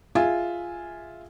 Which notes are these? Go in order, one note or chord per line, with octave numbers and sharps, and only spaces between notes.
F4 G#4 E5 G#5